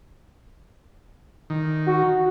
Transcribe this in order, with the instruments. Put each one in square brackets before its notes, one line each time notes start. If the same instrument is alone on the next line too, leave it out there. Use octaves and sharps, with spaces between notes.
[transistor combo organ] D#3
[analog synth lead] F#4